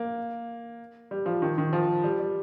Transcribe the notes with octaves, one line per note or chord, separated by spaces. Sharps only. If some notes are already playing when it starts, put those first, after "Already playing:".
Already playing: A#3
G3
F3
D#3
D#3
F3
G3
G3